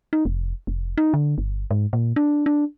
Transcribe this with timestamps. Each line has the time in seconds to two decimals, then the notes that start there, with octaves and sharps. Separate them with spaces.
0.13 D#4
0.25 F1
0.67 F1
0.98 D#4
1.14 D3
1.38 G1
1.71 G#2
1.93 A#2
2.16 D4
2.46 D4